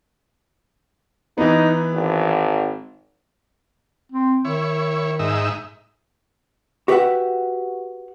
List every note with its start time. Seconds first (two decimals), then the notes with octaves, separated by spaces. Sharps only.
1.38 E3 B3 D#4
1.92 G#1
4.12 C4
4.45 D#3 E4 C#5
5.19 G#2 D#4 E5
6.88 F#4 G4 B4 D5 E5 F#5